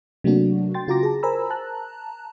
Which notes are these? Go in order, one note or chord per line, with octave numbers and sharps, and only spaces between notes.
C3 F#3 A3 A#3 D4 F#4
G5 C6 A6
C#3 F4 F#4 A#5 D6 A#6
G#4 A5
A#4 C5 G#5 A#5 B5 E6
A5 A#5 F#6